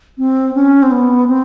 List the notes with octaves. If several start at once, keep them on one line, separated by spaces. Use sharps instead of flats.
C4
C#4
C4
B3
C4